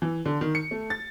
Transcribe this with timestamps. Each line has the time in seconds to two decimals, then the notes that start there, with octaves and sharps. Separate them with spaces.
0.02 E3
0.26 D3
0.41 D#3
0.55 C#7
0.71 A3
0.90 A6